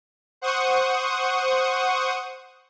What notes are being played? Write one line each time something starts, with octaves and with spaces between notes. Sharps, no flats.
C5 F#5 C#6 D#6